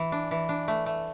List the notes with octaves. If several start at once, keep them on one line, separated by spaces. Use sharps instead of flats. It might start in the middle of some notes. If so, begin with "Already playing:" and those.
Already playing: E3
D4
E3
D4
A3
A3